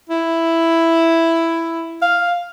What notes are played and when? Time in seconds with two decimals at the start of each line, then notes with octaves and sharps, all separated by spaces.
0.09 E4
2.02 F5